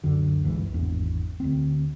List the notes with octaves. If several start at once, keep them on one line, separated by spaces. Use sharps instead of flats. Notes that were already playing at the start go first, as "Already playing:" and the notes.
C#2 F#2 D3
G1 C#2 E3 G#3
G#1 E2 D4
D2 C4